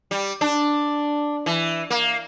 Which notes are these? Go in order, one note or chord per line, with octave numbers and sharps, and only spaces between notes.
G3
D4
E3
A#3